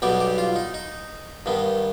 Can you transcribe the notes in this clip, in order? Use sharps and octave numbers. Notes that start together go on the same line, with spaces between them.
B1 B2 G3 B3 G4
G4
F4
D#4
D#4
G2 D#3 B3